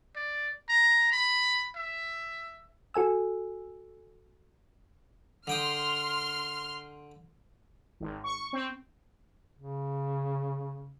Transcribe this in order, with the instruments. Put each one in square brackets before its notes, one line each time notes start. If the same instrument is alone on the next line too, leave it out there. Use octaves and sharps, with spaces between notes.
[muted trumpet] D5
A#5
B5
E5
[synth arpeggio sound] F#4 A4 G#5 E6
[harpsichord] D3 G5 D#6 [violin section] C6 F6
[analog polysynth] G#1
C#6
C4
[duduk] C#3